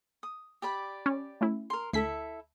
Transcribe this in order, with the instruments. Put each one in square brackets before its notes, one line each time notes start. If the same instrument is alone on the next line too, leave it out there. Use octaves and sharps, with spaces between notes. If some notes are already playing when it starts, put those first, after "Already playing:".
[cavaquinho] D#6
G4 D5 B5
[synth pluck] C#4
A3 C#4 E4
[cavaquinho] A#4 C6
[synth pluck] D2 B6 [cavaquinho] E4 A4 E5